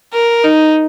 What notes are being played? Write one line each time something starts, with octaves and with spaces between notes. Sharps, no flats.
A#4
D#4